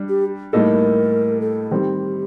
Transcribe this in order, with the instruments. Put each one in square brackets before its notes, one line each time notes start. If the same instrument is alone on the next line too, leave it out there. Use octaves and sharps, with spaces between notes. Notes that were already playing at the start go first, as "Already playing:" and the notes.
Already playing: [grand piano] G3 D4
[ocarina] G4
[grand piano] A2 G3 A#3 D#4 A4 [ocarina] A#4
[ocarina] A4
[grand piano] D#3 G3 C4 [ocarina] G4